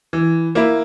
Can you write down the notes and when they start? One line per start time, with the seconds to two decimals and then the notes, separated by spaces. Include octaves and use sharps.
0.13 E3
0.55 A#3 E4